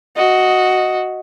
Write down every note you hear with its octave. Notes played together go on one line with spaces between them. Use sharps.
F#4 D#5